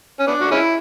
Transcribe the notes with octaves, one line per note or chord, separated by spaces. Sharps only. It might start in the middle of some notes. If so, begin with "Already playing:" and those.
C#4
B3 D4
F#4
G#3 C#4 E4